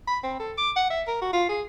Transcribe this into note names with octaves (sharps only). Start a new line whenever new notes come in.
B5
C4
A4
D6
F#5
E5
A#4
F#4
F4
G#4